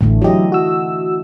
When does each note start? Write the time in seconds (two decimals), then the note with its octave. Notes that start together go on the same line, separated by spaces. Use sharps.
0.01 A1 D3 E3 A3
0.22 F#3 E4 G4 D#5
0.52 F#4 E6